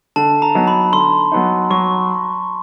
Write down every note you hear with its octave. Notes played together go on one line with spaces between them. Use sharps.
D3 A5
A#5
F#3 B3 D#4
B5
D3 C6
F#3 B3 D#4
F#3 C#6